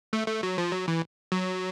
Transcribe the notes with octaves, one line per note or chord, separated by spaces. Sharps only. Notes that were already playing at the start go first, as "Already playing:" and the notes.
A3
A3
F#3
F3
F#3
E3
F#3